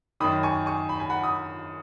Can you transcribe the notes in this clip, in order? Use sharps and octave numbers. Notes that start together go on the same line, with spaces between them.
F#2 D#3 B5 D#6
G#5 C#6
G#5 C#6
B5
G#5
F#5 B5
B5 D#6